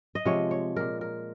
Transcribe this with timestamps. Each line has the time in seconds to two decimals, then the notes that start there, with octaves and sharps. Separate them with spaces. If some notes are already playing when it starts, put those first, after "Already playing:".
0.15 D#5
0.25 C3 F3 G#3 C#5
0.51 C#5
0.76 A#2 G#3 A#4
1.01 A#4